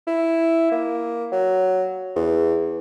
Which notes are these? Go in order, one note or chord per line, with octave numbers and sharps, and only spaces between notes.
E4
A#3
F#3
E2